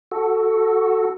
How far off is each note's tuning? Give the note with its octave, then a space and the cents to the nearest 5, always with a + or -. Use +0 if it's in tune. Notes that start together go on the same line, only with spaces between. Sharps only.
F#4 +0 A4 +0